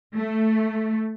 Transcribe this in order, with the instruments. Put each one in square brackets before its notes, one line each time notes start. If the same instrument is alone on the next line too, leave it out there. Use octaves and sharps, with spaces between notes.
[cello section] A3